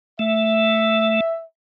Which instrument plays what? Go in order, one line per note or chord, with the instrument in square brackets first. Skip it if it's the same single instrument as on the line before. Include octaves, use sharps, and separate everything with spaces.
[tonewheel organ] A3 [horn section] E5